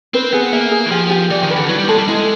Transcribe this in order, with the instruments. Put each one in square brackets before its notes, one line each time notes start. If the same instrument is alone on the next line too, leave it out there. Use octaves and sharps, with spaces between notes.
[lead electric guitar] C4 [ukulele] B4
[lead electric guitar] B3 [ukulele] G#4
[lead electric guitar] A#3 [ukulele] E5
[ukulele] G#4
[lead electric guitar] E3
[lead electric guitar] F3 [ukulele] G4
[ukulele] G4
[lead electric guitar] E3 [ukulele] D5
[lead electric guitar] D#3
[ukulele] B4
[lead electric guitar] D3
[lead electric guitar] F#3 [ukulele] E4
[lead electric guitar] G3
[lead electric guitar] G#3 [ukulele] A4
[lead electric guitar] G3
[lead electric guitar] G#3 [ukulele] E4